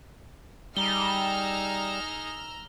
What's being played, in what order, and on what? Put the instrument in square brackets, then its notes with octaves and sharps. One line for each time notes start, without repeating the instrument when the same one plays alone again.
[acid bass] G3 [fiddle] D#4 G#4 [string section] A#5 E6 F6 [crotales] G7